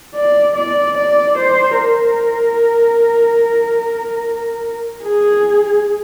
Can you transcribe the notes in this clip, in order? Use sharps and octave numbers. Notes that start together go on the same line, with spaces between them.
D5
D5
D5
C5
A#4
G#4